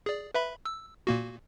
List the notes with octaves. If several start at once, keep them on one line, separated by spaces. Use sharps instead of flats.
G#4 D5
B4 E5 B5
E6
A#2 A#3 F#4